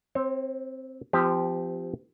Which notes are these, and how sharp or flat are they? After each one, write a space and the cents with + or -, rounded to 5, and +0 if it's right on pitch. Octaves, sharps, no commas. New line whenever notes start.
C4 +0 C#5 -45
F3 -15 C4 -35 G4 +0